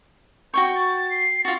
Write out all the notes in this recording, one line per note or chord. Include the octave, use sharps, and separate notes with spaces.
F#4 G5 C#6 G6
A6
C7
F4 F#4 A6